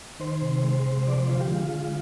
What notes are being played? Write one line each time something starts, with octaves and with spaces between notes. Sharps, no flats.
D#3 C5
C3
G#3
C3
F3 D5
C5
D3 F4
G4
G#3 F4
D3